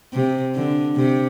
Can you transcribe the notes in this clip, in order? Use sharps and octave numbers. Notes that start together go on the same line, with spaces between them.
C3
D3
C3